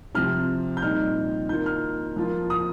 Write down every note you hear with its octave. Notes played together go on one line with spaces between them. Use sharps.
C3 F3 C4 F6
G6
A#2 G3 C4 D#4 F6
D#3 A#3 F4 G6
F6
F2 F3 A#3 F4
D#6